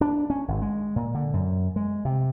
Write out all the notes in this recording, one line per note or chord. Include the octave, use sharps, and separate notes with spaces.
D4
C#4
G#1
G#3
A#2
D3
F#2
G#3
C3